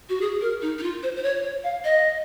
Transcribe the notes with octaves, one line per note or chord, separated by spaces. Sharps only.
F#4
G#4
A#4
D#4
D#4
F4
C5
C5
C#5
C#5
F5
D#5